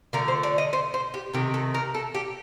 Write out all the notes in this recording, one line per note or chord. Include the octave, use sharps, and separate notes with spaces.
D3 F3 A3 A#4
C5
D5
D#5
C5
C5
G4
C3 D#3 A3 G4
A4
A#4
A4
G4